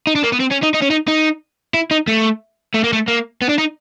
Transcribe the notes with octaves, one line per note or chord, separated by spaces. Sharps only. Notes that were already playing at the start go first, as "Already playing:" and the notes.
D#4
D4
A#3
B3
C4
C#4
D#4
D#4
C#4
D#4
D#4
E4
D#4
A3
A3
A#3
A3
A#3
B3
D4
D#4